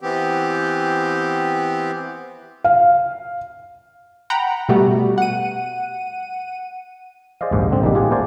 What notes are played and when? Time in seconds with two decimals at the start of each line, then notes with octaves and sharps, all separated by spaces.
0.01 E3 B3 C4 G4
2.64 F5
4.30 F#5 G5 A#5 B5
4.69 B2 G3 A3 B3 F#4 G4
5.18 F#5 D#7
7.41 G#4 C5 D5 D#5 F5
7.52 A#1 D#2 G#2
7.70 D3 C4
7.82 A#1 D#3 G3 G4
7.95 F4 G4 G#4 F#5
8.10 A3 B3 A#4 C5 D5 G#5